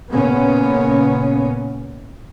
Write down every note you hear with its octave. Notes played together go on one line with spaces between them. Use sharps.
A#2 C#3 A#3 B3 C#4